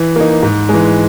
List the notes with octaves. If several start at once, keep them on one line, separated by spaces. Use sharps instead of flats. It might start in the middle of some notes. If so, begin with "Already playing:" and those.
Already playing: E3
A#3 D#4
G#2
E3 G#3